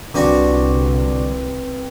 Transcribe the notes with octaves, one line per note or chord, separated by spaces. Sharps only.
C2 D3 C4 F#4 B4 G5